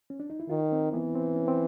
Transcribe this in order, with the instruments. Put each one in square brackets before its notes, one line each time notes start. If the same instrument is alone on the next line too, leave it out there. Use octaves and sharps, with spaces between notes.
[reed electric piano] C#4
D4
D#4
E4
[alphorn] D#3 [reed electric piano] F4
[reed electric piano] C4
[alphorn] E3 [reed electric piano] B3
[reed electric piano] C4
C#4
C4